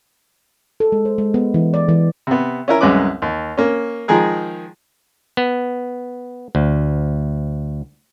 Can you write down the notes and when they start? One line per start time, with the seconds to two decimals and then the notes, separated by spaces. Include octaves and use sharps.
0.80 A4
0.92 G#3
1.05 C5
1.18 G#3
1.34 B3
1.54 E3
1.74 D5
1.89 E3
2.27 C3 B3
2.68 C#4 E4 A#4
2.81 C2 F#2 G#3 C#4 B4 D6
3.22 D#2
3.57 A#3 C#4
4.08 D#3 F3 G#3 G#4 A#4
5.37 B3
6.55 D2